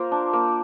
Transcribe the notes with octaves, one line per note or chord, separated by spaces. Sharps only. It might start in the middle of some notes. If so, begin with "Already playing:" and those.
Already playing: A#3 F4 A#4 C5
D4
A#3